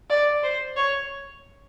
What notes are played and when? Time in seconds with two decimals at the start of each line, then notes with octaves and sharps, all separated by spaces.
0.10 D5
0.43 C5
0.76 C#5